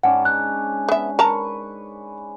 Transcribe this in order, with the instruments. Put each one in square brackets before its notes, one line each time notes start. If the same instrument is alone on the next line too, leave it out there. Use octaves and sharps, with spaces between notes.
[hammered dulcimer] G#2 C#4 D4 [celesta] F#5
[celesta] F#6
[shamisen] B3 E5
[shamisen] A#4 A5 A#5 [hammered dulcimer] B4 C#6